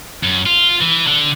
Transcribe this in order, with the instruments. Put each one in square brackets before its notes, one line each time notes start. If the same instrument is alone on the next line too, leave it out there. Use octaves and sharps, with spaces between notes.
[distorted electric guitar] F#2
F4
E3
D3